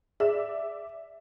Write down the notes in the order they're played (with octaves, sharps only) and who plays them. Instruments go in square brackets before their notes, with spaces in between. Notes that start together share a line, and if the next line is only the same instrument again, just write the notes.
[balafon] G#4 [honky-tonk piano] D5 E5